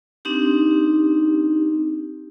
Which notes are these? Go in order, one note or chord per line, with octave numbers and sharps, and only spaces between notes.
C4 D4 D#4 G4